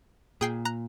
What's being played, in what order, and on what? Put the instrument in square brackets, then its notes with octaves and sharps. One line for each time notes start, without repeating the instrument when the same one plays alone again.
[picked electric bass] A#2 [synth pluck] G#4 G5 C7
[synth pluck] A#5 F#6